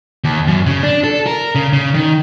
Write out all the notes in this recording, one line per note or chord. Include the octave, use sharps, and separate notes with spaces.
D#2
F#2
C#3
D4
A4
A#4
C#3
C#3
D#3